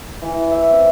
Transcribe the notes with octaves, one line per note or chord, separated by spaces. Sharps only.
E3
E5
C4